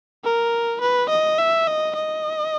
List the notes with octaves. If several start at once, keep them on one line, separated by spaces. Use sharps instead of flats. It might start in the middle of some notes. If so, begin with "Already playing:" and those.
A#4
B4
D#5
E5
D#5
D#5